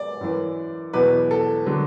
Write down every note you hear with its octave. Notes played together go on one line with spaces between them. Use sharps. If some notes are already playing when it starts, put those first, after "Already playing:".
Already playing: D5
F#2 E3
E2 B2 F#3 B4
A4
D3 F#3